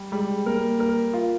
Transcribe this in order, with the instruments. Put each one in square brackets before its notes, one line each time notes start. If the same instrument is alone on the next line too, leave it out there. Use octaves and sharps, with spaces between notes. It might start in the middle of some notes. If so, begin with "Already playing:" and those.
Already playing: [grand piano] G3
[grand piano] G3 [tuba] G#3
[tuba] A#3 [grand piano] A#4
[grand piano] A#4
F4